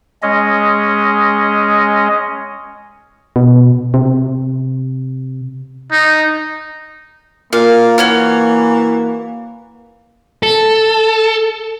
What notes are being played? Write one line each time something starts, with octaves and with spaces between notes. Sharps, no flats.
G#3 C#4 D#5
B2
C3
D#4
A#2 A#3 F5
E3 F#4 C#5 F6
A4